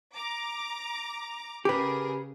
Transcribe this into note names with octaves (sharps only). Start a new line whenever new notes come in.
A#5 D6
C#3 G4 G#4 A#4 B4